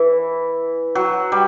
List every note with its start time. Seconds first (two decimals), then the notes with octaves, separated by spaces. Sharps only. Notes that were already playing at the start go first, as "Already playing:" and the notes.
Already playing: E3
0.95 F#3
1.32 G3